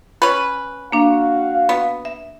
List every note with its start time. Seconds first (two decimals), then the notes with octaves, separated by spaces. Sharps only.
0.22 C#4 B4
0.92 A#3 D4 F#4 F5
1.69 B3
2.05 E5